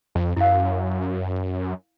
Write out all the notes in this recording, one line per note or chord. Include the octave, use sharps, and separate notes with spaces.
F2
F#2 E4 F5